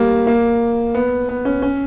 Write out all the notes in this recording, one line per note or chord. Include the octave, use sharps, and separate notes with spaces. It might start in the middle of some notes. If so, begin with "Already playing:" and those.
Already playing: G3 A#3
A#3
B3
B3
C#4
C#4